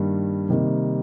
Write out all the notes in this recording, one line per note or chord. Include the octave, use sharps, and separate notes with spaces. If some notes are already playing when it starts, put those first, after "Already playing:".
Already playing: G2 D#3 G3 A#3
C3 D#3 G3 A#3 D#4